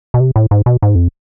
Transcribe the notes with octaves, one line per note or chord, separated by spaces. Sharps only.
B2
C3
A2
G#2
B2
G#2
F2